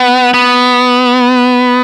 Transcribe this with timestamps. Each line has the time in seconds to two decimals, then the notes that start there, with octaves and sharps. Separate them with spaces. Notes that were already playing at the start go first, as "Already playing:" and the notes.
Already playing: B3
0.34 B3